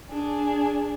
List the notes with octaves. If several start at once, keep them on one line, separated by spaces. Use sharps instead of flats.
D4 G#4